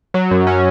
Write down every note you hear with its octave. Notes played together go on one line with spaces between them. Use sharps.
F#3
F#2
C#4